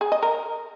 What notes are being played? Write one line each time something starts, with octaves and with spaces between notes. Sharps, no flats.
G#4
D#5
A#4